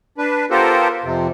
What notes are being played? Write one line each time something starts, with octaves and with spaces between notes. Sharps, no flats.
D4 B4
B3 F4 G4 A4 A#4 C5
F2 C3